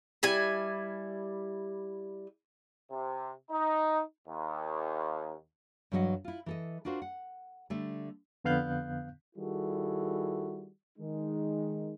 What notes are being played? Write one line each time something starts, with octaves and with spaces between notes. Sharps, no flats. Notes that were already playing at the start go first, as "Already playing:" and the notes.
G3 E4 G#5
C3
D#4
D#2
G2 E3 F#3 G4 D#5 F#5
E4 F4
E3 A4 D#5
D4 F4 F#4 A#4 C5
F#5
D3 G3 A3
F2 D3 B3 F5 F#6 G6
D#3 G3 E4 F#4 G#4 A4
D#3 G#3 D#4